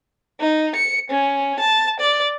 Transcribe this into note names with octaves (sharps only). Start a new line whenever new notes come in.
D#4
C#7
C#4
A5
D5